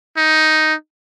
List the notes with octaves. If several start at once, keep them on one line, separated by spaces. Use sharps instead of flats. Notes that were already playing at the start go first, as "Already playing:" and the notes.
D#4